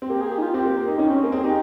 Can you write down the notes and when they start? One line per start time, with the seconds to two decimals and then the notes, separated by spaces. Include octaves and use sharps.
0.02 C4
0.09 A#3 G4
0.21 G#4
0.31 G4
0.38 D#4
0.42 F4
0.54 C4 G4
0.65 A#3
0.77 A#3
0.88 D#4
0.98 C#4 D#4
1.10 C4 C#4
1.24 A#3
1.32 C4 G#4
1.44 D#4 G4